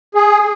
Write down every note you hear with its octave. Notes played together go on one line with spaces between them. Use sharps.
G#4